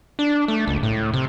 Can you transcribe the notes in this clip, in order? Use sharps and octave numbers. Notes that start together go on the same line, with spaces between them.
D4
A3
C#2
A2
C3